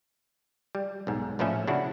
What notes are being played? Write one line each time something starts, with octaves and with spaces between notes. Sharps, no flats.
G3
B1 G#2
A#1 A2 F3 A3 C#4 E5
C#3 D4 E4 F#4